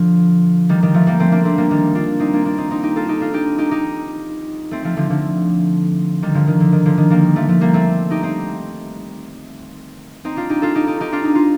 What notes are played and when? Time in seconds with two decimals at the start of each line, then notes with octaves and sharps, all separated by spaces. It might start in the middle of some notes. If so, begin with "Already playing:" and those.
Already playing: D3 F3
0.69 D#3 G3
0.82 D#3 G3
0.94 F3 A3
1.07 G3 A#3
1.19 A3 C4
1.32 A#3 D4
1.45 A3 C4
1.58 G3 A#3
1.71 D#3 G3
1.95 D4 F4
2.20 C4 D#4
2.33 A#3 D4
2.45 A#3 D4
2.58 C4 D#4
2.71 C4 D#4
2.83 D#4 G4
2.96 F4 A4
3.09 D#4 G4
3.21 D4 F4
3.34 D#4 G4
3.58 D#4 G4
3.71 D#4 G4
4.71 A3 C4
4.84 F3 A3
4.97 D3 F3
5.10 D3 F3
6.22 D#3 G3
6.34 D3 F3
6.47 D#3
6.60 D3
6.72 D#3
6.85 D3 F3
6.98 D#3
7.10 G3 A#3
7.36 F3 A3
7.48 F3 A3
7.61 G3 A#3
7.74 A3 C4
8.11 D#4 G4
8.23 C4 D#4
10.25 C4 D#4
10.36 D4 F4
10.50 D#4 G4
10.62 F4 A4
10.75 D#4 G4
10.87 D#4 G4
11.00 D#4 G4
11.12 D4 F4
11.25 D#4
11.35 F4